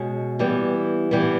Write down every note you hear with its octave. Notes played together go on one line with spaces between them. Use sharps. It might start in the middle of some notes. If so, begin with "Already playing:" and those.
Already playing: B2 G#3 C#4
E3 G3 B3
E3 G3 B3